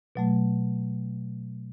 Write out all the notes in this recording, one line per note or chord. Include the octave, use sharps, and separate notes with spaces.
B2 F#3 A3